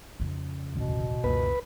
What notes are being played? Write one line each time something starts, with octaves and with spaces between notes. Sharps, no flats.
F2 C#3
E1 A1 D2 B2
C#2 F#2 A#3 B4